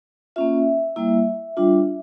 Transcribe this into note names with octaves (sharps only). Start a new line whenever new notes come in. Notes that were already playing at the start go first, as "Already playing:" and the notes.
A#3 C#4 F4 E5
G3 A#3 E4
G3 D4 F4